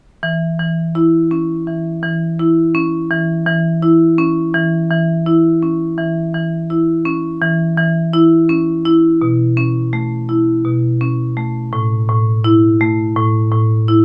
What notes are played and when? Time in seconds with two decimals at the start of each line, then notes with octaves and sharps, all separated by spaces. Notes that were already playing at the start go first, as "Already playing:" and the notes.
0.23 E3
0.60 E3
0.95 E4
1.31 C#4
1.67 E3
2.03 E3
2.39 E4
2.75 C#4
3.11 E3
3.47 E3
3.82 E4
4.18 C#4
4.54 E3
4.90 E3
5.26 E4
5.62 C#4
5.98 E3
6.34 E3
6.70 E4
7.05 C#4
7.42 E3
7.77 E3
8.13 E4
8.49 C#4
8.85 E4
9.22 B2
9.57 C#4
9.93 A3
10.29 E4
10.65 B2
11.01 C#4
11.37 A3
11.73 A2
12.09 A2
12.44 E4
12.81 A3
13.16 A2
13.52 A2
13.88 E4